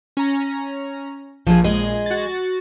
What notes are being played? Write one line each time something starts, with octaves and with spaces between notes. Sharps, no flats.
C#4 A#5
A#1 F3 G#4
G#3 G#4 D#5
F#4 A6